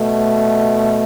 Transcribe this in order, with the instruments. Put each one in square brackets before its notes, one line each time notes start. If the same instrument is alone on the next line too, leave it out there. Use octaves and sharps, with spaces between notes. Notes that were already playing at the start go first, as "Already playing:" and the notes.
Already playing: [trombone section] B2 A3